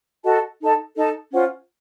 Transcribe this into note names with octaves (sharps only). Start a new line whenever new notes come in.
F#4 A4 D#5 A5
D#4 A4 D#5 A5
D#4 A4 D#5 A5
C#4 F4 C5 F#5